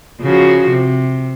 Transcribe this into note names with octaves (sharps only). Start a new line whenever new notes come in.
C#3 F3 F#4
C3